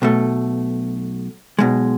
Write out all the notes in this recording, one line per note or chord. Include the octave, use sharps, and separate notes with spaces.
B1 B2 A3
B1 B2 G#3